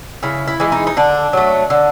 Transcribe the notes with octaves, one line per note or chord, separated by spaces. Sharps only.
C#3 E4
E4
E3 G#3
D#4
D#4
D3 D4
F#3 A3
D3